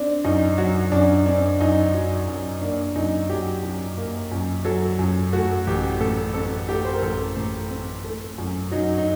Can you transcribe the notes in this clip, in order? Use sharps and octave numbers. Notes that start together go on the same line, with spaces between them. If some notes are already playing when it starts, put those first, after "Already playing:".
Already playing: C4 D4
F#2 D#4
F#3 F#4
F#2 D4
C4 D4
F#2 D#4
F#3
F#2
A#3 D4
F#2 D#4
F#3 G4
F#2
A#3
F#2
F#3 A4
F#2
A3 F#4
A1 G4
A2 A4
C4 A4
A3 G4
C5
A#4
A1 A4
A2
C4
A3
F#2
F#3 D#4
D#4